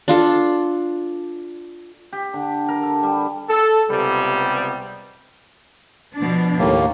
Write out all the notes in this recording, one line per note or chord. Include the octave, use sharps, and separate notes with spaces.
D4 F4 A4
G4
D3
A#4
A4
G3
A4
C#2 C3 G3 B3
B2 F3 D4
D#2 A2 A3 A#3